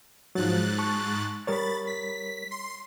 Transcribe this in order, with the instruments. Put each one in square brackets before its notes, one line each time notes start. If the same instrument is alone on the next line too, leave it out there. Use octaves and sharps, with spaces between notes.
[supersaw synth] G#2 F#6 A6 [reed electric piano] F3 F#3
[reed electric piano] A5 C#6
[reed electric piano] G3 A#4 C#5 [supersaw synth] B5 A6
[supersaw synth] B6
C6